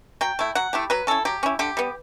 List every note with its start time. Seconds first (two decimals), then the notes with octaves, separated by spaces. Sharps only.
0.21 F#3 G5
0.39 A3 E4
0.55 F#3 F#5
0.73 A3 E4 G4
0.90 F#3 B4
1.07 C#4 E4 A4
1.25 F#3 G4
1.43 C#4 E4
1.59 D3 G4
1.77 G3 B3